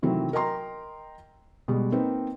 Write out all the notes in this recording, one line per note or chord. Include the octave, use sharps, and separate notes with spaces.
C3 D#3 E3 F#3 A3 C4
A#4 D#5 G5 A#5 C6
B2 G3 G#3
A#3 C4 D#4 A#4 B4